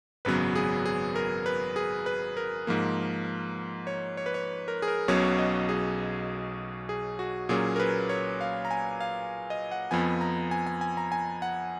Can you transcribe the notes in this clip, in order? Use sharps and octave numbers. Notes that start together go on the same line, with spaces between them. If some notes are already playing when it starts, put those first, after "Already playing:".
G#1 F#2 C#3 F#3 B3 B4
G#4
G#4
A#4
B4
G#4
B4
A#4
G#2 F3 A#3
C#5
C#5
B4
C#5
A#4
G#4
A#4
B1 B2 F#3 C#4 C#5
D#5
G#4
G#4
F#4
A#2 F#3 A#3 C#4 G#4
A#4
B4
C#5
F5
A#5
G#5
F5
D#5
F#5
F2 F3 B3 G#5
A#5
G#5
G#5
G#5
A#5
G#5
F#5